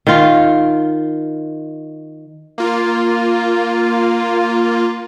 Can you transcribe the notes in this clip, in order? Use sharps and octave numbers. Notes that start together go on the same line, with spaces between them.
D#3 F4
A#3 F4